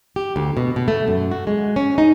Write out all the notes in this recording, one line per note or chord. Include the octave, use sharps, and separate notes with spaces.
G4
D2
B2
B2
A3
F#2
F#4
G#3
C#4
D#4